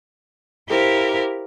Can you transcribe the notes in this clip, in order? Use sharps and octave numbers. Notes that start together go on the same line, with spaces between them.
E4 G4 A#4 C5 F5